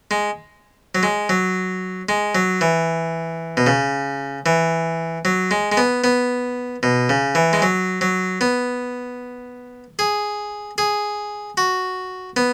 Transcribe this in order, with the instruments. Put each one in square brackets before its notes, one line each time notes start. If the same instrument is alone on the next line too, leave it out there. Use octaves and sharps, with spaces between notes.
[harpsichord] G#3
F#3
G#3
F#3
G#3
F#3
E3
B2
C#3
E3
F#3
G#3
G#3
B3
B3
B2
C#3
E3
G#3
F#3
F#3
B3
G#4
G#4
F#4
B3